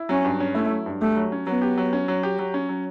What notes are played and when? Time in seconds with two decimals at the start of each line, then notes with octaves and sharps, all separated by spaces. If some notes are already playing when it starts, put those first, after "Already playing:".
Already playing: E4
0.09 F#3 C#4
0.24 G2
0.40 C#4
0.55 A3 E4
0.70 F#3
0.86 G2
1.01 A3 G4
1.16 F#3
1.32 C#4
1.47 F#3 B3
1.62 G4
1.77 F#3
1.93 C#4
2.08 F#3
2.23 G4
2.39 F#3
2.54 C#4
2.69 F#3